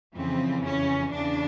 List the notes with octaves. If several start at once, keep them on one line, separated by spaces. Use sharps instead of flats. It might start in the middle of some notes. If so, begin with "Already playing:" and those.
F2 C#3 E3 C4
C#4
E2 C#3 E3 D4